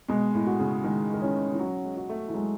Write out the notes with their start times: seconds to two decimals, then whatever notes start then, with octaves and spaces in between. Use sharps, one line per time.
0.09 B2 G#3
0.34 A2
0.47 F#4
0.59 C#3
0.84 D#3 G#3
1.14 D#3
1.21 E3 C#4
1.52 E3
1.59 F#3 F#4
1.84 G#3
1.97 F#4
2.09 A3
2.28 E3
2.34 F#3 G#3